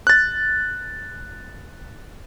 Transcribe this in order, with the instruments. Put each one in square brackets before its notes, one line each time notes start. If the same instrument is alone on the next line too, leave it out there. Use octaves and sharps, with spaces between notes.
[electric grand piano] F#6 A6